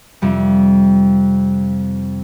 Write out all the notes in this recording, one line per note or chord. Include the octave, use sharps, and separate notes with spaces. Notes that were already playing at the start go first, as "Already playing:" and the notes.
F2 C3 G3